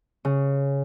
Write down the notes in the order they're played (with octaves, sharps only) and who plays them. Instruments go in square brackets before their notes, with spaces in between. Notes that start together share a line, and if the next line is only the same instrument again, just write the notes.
[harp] C#3